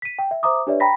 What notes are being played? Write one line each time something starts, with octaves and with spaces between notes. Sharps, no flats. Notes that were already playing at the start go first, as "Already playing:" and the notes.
B6 D#7
G5
E5
C5 E5 A#5 D6 D#6
D4 G4 B4 C#5 D5 E5
G5 A#5 B5 A#6 B6